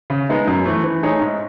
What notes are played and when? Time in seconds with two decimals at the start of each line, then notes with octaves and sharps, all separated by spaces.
0.10 C#3
0.29 G#3 B3 D#4
0.47 F#2
0.65 E3 A3
0.84 E3
1.03 A3 D#4 G#4 C#5
1.21 G#2